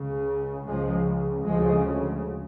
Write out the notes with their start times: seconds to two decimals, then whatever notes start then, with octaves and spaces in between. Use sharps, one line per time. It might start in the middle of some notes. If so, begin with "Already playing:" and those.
Already playing: C#2 C#3
0.68 C#2 C#3 F3 G#3
1.47 D2 C#3 F3 G#3